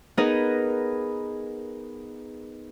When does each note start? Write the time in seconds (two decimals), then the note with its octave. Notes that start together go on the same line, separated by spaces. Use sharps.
0.17 B3 D#4 G#4 A#4 B4 D#5